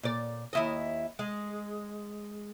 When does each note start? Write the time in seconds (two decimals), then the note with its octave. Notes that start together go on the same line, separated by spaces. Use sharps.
0.03 A#2 D5
0.53 D#2 E4 D#5
1.19 G#3